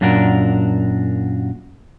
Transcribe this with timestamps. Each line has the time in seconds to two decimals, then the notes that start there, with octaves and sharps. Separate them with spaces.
0.01 F#2 A#2 D4 F#4 A#4